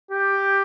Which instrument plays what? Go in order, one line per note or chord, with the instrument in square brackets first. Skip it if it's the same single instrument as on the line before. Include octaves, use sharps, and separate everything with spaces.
[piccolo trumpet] G4